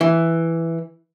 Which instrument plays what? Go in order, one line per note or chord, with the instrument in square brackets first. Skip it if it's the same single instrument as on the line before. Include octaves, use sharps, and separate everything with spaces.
[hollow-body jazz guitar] E3